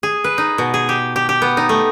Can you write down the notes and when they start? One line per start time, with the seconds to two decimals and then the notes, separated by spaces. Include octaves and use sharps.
0.03 G#4
0.24 B4
0.38 D#4
0.58 B2
0.74 G#4
0.89 G4
1.16 G4
1.29 G4
1.42 B3
1.57 D#4
1.69 A3